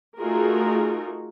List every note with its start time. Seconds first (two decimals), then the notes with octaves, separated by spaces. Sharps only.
0.20 A3 D#4 F4 F#4 G#4 A#4